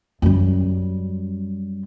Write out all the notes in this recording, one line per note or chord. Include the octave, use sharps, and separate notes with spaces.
F#2 G3